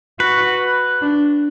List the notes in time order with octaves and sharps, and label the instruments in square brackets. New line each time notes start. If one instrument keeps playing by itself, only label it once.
[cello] F#4 [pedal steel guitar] B4
[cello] D4